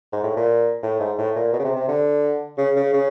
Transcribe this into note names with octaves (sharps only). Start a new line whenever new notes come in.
G#2
A2
A#2
A2
G#2
A2
A#2
B2
C#3
C3
C3
D3
C#3
C#3
C#3